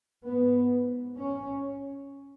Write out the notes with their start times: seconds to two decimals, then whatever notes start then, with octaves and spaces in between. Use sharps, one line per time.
0.24 G#2 B3
1.18 C#4